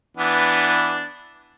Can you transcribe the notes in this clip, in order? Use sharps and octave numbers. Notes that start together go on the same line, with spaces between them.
E3 B3 D4